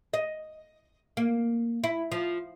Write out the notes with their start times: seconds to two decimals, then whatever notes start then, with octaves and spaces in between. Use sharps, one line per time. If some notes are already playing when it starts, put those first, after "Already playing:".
0.14 D#5
1.17 A#3
1.84 E4
2.12 F3